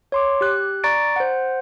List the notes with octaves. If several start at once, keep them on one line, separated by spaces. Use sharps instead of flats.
C#5 C6 D6
G4 F#6
D5 A#5 C#6 A6 D7
C5 F#5